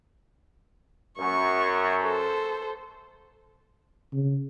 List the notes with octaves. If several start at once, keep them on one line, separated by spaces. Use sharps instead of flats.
F#2 C#6
A4 C5
C#3